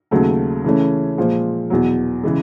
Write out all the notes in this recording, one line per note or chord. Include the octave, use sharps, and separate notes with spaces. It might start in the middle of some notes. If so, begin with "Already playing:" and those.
D#2 C#3 F#3 A3
C#3 E3 A3 C#4
A#2 F3 G#3
E2 B2 F#3
C#3 E3 G#3